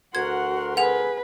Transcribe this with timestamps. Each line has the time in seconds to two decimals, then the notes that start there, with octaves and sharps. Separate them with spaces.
0.15 D2 F#4 A#4 F#5 C6 G#6
0.77 G#4 B4 F#5 F7